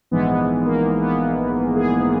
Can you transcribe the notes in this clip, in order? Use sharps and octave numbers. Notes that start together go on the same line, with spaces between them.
A#1 G#2 E3 G#3 B3
A#3
B3
G#4